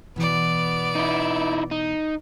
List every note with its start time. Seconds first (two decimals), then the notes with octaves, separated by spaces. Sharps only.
0.16 B2 E3 B3 D5
0.95 D#4 E4
1.71 D#4